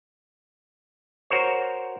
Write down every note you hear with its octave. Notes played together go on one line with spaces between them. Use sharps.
F#4 A#4 C5 C#5